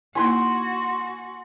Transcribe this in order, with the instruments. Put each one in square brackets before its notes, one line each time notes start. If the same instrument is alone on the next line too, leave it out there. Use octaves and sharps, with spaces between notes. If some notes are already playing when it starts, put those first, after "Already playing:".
[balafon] A#3 D#4 E4 [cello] F#4 F#5 [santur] G#5 C6 E6